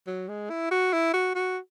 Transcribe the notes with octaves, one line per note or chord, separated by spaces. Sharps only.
F#3
G#3
E4
F#4
E4
F#4
F#4